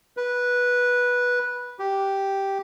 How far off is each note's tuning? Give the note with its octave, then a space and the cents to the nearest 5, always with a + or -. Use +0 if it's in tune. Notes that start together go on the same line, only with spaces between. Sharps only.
B4 -10
G4 -5